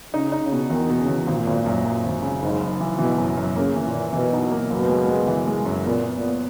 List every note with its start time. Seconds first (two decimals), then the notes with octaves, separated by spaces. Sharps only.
0.13 C#3 D#4
0.32 D#4
0.42 C#3
0.52 B2
0.70 E2 D#3
0.89 B2
0.99 C#3
1.08 E2
1.27 G#1 A#2
1.47 G#1
1.66 F#2
1.85 F#2
2.04 G#1
2.22 C#3
2.42 F#1 G#2
2.61 F#1
2.80 E3
2.99 B2 E3
3.18 F#2
3.37 F#2
3.56 C#3 A#3
3.76 E3
3.85 A#2
3.95 E3
4.13 B2 E3
4.33 D#4
4.51 A#3
4.70 F#1 B2
4.89 G#3
5.08 G#3
5.27 E3
5.48 G#3
5.66 F#2
5.85 A#2 B3
6.04 B3
6.14 A#2
6.23 B3